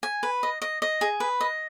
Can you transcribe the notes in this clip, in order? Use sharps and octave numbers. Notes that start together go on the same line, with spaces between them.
G#5
B4
D#5
D#5
D#5
G#4
B4
D#5